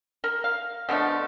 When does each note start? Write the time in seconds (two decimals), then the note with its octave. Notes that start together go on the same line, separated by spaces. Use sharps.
0.24 A#4
0.44 F5
0.89 B2 D3 F3 A3